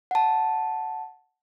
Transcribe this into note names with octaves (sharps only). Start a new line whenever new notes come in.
F#5 A5